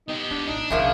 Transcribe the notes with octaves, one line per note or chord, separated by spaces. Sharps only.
B3 D#4 G4
D4 F4
A1 D4 D#4
B1 C#3 F3 A#3 E5